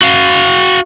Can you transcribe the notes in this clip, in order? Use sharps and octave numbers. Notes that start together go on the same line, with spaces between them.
F#4 F5